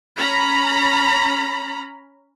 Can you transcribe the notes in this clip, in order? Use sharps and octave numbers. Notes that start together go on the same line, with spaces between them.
C#4 A#5 B5